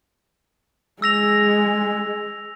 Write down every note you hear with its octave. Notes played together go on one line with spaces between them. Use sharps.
G#3 E6 A#6 F7